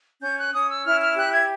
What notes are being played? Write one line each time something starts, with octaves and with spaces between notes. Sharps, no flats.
C#4 G6
F#6
C#4 D#6
E6
E4 F6
F6
G4 F#6
G#6